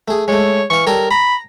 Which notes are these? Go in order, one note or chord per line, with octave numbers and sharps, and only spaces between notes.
A3 G#4
G#3 A3 C#5
E3 F5 C#6
G3 A4 A#4 C#5
A#5 B5